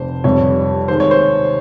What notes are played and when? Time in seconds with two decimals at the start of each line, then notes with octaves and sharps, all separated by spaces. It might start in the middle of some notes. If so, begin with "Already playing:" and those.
Already playing: F1 F2 C3 C5
0.24 F1 F2 C3 G3 C#5
0.88 D#2 D#3 G#3 C5
1.00 C#5
1.11 C5